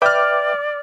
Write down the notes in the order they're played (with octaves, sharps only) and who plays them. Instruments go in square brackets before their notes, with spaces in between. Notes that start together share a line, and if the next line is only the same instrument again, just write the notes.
[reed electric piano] B4 E5 G5 [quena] D5 [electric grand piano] D6 F6